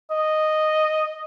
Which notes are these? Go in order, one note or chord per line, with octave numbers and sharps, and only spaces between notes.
D#5